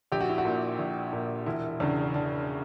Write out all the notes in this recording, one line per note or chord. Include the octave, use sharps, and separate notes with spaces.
A#1 G4
F#4
E4
F#4
A#2
A#1
A#2
E1 E4
E2 C#3 D4
E1 D4